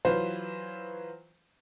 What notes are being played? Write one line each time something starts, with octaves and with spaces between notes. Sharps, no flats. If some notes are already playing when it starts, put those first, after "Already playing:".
E3 F#3 F4 B4 C5